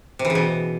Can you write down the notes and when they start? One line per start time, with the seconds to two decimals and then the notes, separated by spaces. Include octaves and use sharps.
0.19 C3
0.25 E3
0.30 C#3
0.35 B2